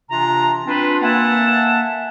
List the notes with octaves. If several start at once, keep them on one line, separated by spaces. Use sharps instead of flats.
C3 E3 D4 F4 A#5
C4 D4 F4 B4
A#3 E5 F#5 G#5 A5